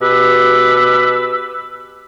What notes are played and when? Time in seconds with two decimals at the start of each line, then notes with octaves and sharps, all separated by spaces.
0.01 B2 G4 B4 E6